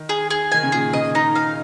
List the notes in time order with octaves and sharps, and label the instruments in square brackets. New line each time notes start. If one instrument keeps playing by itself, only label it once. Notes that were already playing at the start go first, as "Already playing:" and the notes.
Already playing: [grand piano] D#3
[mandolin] G#4
G#4
[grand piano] D#3 [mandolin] G#5
[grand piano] C#3
[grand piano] A#2 [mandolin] G#4
[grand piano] C#3 [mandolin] D#5
[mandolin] D#4
F5